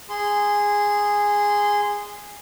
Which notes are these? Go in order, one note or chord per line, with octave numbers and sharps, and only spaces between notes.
G#4 C6